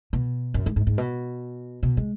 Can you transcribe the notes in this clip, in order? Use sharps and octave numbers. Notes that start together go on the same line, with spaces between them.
B2
F#2
G#2
G#2
G#2
B2
B2
G#3